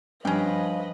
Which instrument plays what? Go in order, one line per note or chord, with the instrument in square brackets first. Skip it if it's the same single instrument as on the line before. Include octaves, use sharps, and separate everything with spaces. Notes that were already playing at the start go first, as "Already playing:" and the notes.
[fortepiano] G2 [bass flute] F3 [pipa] C#4 G5 [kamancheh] B4 D#5